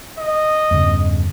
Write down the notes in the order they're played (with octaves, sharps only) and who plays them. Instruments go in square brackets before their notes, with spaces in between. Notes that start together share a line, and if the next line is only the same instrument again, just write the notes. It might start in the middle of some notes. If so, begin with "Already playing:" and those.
[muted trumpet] D#5
[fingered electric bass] E2 G2 C#3